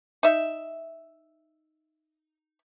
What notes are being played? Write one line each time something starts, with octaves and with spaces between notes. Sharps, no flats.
D#4 E5